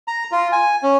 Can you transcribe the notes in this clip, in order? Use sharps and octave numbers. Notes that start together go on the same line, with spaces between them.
A#5
F4
G#5
C#4